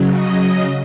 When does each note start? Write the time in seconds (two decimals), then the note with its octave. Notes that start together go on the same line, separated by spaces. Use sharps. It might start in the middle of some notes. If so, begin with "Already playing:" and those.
Already playing: C#3 F#3
0.15 D#5